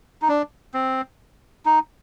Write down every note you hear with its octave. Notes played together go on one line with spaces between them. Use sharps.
D#4
D4
C4
D#4